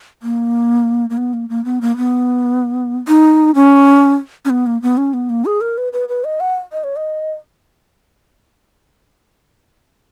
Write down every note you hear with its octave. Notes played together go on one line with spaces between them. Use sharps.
A#3
A#3
B3
A#3
A#3
B3
A#3
B3
D#4
C#4
C#4
B3
A#3
B3
C#4
B3
A#3
G#4
A#4
B4
B4
B4
D#5
F#5
D#5
C#5
D#5